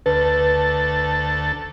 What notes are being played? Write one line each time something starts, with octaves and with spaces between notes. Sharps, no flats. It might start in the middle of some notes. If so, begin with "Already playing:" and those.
D2 A4 B4